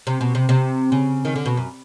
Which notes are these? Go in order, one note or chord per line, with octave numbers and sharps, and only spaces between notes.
C3
B2
C3
C3
C#3
D#3
D3
B2
F#2